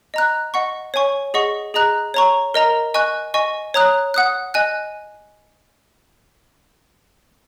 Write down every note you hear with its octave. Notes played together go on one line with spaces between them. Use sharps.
D#5 A#5 F#6
D#5 F#5 C#6
C#5 G#5 C#6
G#4 D#5 F#5 C#6
G#4 D#5 A#5 F#6
C#5 A#5 C#6
A#4 D#5 A#5
D#5 G#5 C#6 F#6
D#5 G#5 C#6
C#5 A#5 D#6 F#6
F#5 D#6 F#6
D#5 G#5 F#6